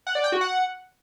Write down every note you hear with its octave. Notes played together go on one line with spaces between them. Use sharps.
F#5
D5
G5
F#4
F#5